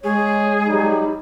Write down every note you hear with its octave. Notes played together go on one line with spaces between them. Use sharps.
G#3 G#4 C#5
F#3 G3 D#4